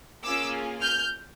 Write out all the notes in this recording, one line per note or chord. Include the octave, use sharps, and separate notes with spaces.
A#3 C#4 F4 G#4 D6 E6
F6 G6